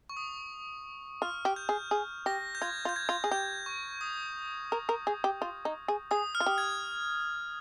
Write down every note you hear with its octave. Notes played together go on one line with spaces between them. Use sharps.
C#6
D#6
F4 F6
G4
G6
G#4
G#4
G4 A#6
G6
F4 G#6
F4
G6
G#6
F4
G#4
G4 G6
C#6
D#6
A#4
A#4
G#4
G4
F4
D#4
G#4
G#4 D#6
F6
F4
G4
G#6